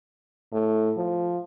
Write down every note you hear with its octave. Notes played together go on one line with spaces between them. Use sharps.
A2
F3